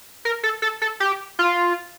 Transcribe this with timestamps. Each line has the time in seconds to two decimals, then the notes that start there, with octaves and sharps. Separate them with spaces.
0.25 A#4
0.43 A4
0.62 A4
0.82 A4
1.00 G4
1.39 F4